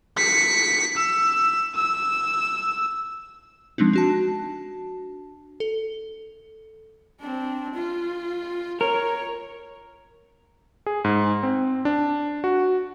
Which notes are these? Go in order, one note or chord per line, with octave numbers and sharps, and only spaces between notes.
B6 C#7
E6
E6
F3 G#3 C4 D4 D#4
D4 F#4 A5
A4
C4 D4
F4
A#4 C#5
G#4
G#2
C4
D4
F#4